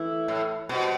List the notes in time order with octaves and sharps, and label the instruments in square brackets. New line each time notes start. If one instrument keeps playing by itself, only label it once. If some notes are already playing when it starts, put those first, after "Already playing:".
Already playing: [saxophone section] E3 A3 E4
[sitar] A2
[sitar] B2 [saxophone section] G3 C4 F#4 C5